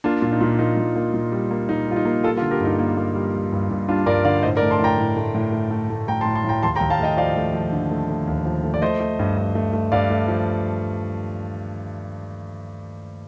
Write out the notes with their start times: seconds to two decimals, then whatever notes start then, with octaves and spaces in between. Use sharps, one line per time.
0.04 A#3 D4 F4
0.22 A#2
0.32 D#4
0.41 A#2
0.59 A#3 D#4
0.77 A#2
0.96 A#3
1.14 A#2
1.32 G3
1.51 A#3
1.69 A#2 D#4
1.88 G3 F4
1.96 D#4
2.05 A#3
2.24 G3 F4 A4
2.37 F4 A4
2.42 D3
2.51 G4 A#4
2.61 G2 D#4
2.79 A#3
2.97 A#3
3.15 G3
3.34 G3
3.52 G2
3.70 G2
3.88 G3 D4 F4
4.06 G2 A#4 D5
4.25 D3 D5 F5
4.43 A2 C5 D#5
4.57 A#4 D5
4.62 A3
4.71 A5 C6
4.79 A2 G5 A#5
4.97 A2
5.17 A3
5.35 A2
5.53 A3
5.71 A3
5.90 A3
6.08 A3 G5 A#5
6.21 A5 C6
6.26 A2
6.35 A5 C6
6.44 A2 G5 A#5
6.62 D#2 A5 C6
6.76 G5 A#5
6.81 D#2
6.90 F5 A5
7.00 A3 D#5 G5
7.17 F3 D5 F5
7.36 A3
7.54 F3
7.72 D3
7.91 A3
8.10 A3
8.27 D#2
8.45 F3
8.64 A3
8.74 D5
8.82 A3 C5 D#5
9.00 A3
9.19 G2
9.38 G2
9.55 A3
9.73 A3
9.92 G2 D5 F5
10.10 A3
10.28 F3